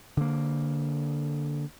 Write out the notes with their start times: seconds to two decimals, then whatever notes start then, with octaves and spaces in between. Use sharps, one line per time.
0.17 D3 A#3